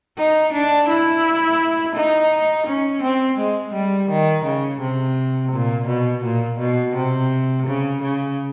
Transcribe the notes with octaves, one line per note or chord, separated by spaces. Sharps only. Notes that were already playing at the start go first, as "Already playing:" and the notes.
D#4
D4
E4
D#4
C#4
C4
G#3
G3
D#3
C#3
C3
A#2
B2
A#2
B2
C3
C#3
C#3